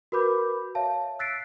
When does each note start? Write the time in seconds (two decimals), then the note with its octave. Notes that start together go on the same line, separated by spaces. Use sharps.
0.12 F#4 A#4 B4 B5 D6 G6
0.75 C#5 E5 F5 A5
1.19 E6 F#6 A6 B6 C7 D7